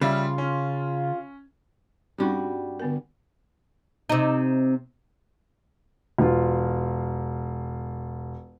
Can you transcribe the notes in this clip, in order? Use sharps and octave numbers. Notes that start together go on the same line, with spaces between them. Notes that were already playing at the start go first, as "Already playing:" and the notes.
C#3 G3 F4 E5
C#4
G2 G3 C4 C#4 D#4 F#4
D3 B3 A#4
C3 D#4
E1 F4